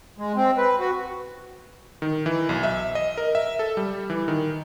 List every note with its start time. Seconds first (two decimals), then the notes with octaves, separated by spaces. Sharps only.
0.18 G#3
0.36 C4
0.58 B4
0.79 F#4
2.02 D#3
2.26 E3
2.49 B1
2.63 E5
2.95 D#5
3.17 A#4
3.35 E5
3.59 A4
3.77 G3
4.10 E3
4.28 D#3